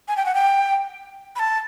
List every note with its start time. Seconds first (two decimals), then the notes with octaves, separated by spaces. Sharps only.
0.08 G#5
0.17 G5
0.26 F#5
0.35 G5
1.36 B5
1.39 A5